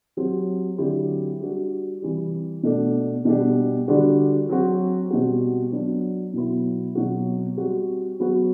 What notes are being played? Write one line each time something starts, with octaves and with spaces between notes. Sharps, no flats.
F#3 C4 G4
D3 F#3 C4 E4 G4
G3 D4 F#4
C3 E3 G3
B2 A3 D4
B2 G3 D4 G4
D3 G3 D4 F#4
F#3 C4 F#4
B2 G3 C4 F#4
F#3 B3 D4
B2 F#3 B3 E4
B2 F#3 C4 F#4
G3 C4 F#4
F#3 B3 F#4